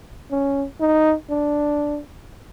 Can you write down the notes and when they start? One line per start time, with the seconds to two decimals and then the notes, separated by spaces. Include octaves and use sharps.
0.31 C#4
0.80 D#4
1.30 D4